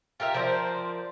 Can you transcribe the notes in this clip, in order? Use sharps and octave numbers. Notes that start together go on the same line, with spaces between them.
F4 G4 A#4 E5
F3 A#4 C5 D5